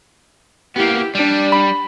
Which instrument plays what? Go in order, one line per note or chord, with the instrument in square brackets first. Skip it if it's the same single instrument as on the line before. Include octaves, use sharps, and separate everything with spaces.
[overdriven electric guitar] A#3 B3 [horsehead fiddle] E4 G4
[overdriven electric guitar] G3 [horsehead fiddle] D4
[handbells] B5